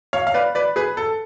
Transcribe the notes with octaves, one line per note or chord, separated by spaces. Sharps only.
C#5 F5
F5
B4 D5
B4 D5
G#4 B4
A4